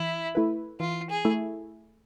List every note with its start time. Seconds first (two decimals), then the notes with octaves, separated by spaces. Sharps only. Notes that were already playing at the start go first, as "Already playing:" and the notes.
Already playing: E3 E4
0.35 A3 E4 B4
0.80 E3 F4
1.10 G#4
1.25 A3 E4